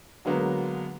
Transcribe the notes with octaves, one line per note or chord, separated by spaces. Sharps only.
D3 F#3 G#3 A#3 B3